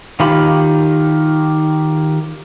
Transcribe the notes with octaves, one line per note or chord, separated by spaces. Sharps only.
D#3 F4 G4 B5